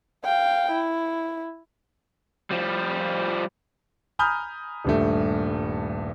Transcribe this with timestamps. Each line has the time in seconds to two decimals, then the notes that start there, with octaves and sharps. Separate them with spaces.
0.24 F5 G5
0.72 E4
2.50 F3 G3
4.19 G#5 A#5 B5 D#6 F6 G6
4.85 D#1 G2 A3